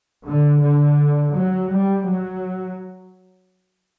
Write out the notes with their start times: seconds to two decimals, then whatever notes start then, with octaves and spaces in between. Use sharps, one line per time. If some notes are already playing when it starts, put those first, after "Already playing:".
0.27 D3
0.63 D3
1.34 F#3
1.70 G3
2.06 F#3